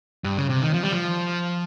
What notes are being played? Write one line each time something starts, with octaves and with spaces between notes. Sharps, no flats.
G2
C#3
C3
D#3
F3
G3
F3